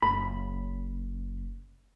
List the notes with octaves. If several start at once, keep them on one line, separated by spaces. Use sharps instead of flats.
F#1 B5